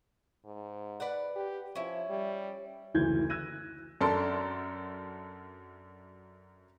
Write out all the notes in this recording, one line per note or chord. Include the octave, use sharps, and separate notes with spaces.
G#2
B4 D5 F#5
G4
F3 C#4 E4
G3
F#1 D2 E3 E4 G6 G#6
E6 F#6 G#6 A#6 D#7
F#2 D4 A4 A#4 C6